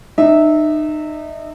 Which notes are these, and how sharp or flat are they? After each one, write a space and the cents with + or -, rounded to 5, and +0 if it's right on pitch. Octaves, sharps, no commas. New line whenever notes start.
D#4 -35 E5 -15